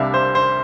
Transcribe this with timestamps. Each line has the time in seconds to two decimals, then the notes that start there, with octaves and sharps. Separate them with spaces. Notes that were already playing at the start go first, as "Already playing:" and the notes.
Already playing: C2 C3 G3 D4 E5 F5
0.14 C5
0.35 C5